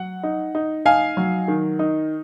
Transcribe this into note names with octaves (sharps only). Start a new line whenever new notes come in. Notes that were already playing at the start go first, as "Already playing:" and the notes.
Already playing: F#3 F#5
D#4
D#4
D#4 F5 G#5
F#3
D#3
D#4